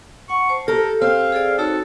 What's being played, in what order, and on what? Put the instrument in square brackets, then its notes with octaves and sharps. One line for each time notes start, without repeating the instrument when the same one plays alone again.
[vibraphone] F#5 [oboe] C#6
[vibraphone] C5 A5
[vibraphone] G4 [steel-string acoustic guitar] A4 [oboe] A#4
[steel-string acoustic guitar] C4 [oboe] F5
[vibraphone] G#4 A4 D5
[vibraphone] D#4 F#4 C#5 [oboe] A4